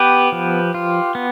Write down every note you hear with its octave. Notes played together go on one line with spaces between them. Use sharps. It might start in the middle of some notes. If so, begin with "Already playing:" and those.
Already playing: B3 G4 B4
F3
F4
B3